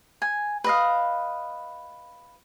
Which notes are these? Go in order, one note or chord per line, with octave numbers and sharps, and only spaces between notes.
G#5
B4 D#5 F5